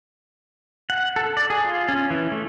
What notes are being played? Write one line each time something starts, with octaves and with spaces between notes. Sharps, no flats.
F#5
A4
D5
G#4
F4
C#4
E3
A3